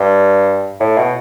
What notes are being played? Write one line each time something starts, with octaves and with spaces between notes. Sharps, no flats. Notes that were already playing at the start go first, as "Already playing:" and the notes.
Already playing: G2
A2
B2